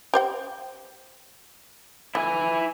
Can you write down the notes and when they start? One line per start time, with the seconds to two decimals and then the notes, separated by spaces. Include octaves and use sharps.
0.14 G4 C5 G5
2.15 A3 E4 G#5